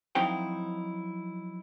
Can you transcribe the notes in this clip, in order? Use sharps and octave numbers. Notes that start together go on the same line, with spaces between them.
F3 F#3 C4 D#4 E4 G5